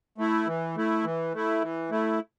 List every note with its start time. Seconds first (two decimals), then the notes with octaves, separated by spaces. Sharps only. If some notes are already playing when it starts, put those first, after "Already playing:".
0.18 A3 E4
0.47 E3
0.76 A3 E4
1.04 E3
1.34 A3 E4
1.62 E3
1.91 A3 E4